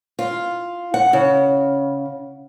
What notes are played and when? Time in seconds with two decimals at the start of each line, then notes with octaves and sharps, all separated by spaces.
0.19 F4
0.94 F#5
1.13 C#3